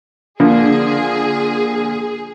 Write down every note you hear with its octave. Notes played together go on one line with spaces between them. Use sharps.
D3 F3 A#3 G#4